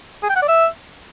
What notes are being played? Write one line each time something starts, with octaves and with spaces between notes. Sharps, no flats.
G#4
G5
F#5
D5
E5